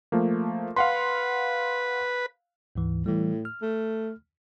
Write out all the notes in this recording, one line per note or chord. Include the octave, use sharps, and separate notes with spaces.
F3 A3 A#3
B4 F5 F#5 C6
D2 G#2 E3
A2 E3 G3
F6
A3